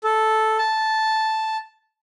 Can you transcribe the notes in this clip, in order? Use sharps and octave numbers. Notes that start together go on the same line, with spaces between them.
A4
A5